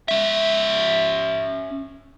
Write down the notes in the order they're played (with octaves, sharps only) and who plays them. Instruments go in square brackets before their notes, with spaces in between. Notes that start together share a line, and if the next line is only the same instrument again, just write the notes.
[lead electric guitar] C#4 E5